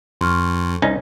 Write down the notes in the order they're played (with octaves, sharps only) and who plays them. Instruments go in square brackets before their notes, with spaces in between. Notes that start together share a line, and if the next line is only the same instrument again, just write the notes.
[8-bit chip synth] F2 [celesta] C6 C#6 F6
[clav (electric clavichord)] C2 C#4 D#4